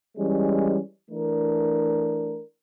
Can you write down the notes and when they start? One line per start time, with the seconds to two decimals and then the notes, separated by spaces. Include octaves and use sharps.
0.18 E3 G3 G#3 C#4
1.10 E3 A3 D4 A#4